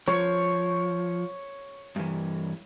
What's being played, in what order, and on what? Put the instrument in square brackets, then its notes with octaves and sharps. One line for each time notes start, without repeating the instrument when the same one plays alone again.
[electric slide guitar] F3 [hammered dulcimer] C#5
[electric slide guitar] G2 E3